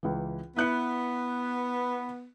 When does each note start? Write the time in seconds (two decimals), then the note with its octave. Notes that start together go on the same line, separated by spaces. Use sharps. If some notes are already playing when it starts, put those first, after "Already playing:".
0.03 C#2 E3
0.57 B3 E4 F#6 C#7